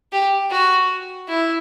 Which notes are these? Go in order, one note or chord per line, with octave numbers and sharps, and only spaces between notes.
G4
F#4
E4